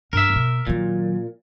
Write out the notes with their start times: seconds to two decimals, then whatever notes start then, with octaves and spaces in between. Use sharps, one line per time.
0.13 G2 A#4 E5
0.34 B2 A#3
0.67 A#2 D#3 F#3